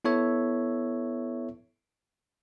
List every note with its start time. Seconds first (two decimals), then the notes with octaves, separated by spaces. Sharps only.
0.05 B3 E4 A4 C#5 E5